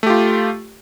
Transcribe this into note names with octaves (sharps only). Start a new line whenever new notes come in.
A3 F4 G4